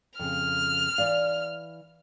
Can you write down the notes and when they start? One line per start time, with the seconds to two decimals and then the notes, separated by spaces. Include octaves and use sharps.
0.19 F2 C#3 F6
0.98 E3 D5 F5